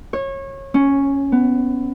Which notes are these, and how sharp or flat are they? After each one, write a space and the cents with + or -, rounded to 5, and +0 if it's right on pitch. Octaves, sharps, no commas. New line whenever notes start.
C#5 -25
C#4 +0
B3 +15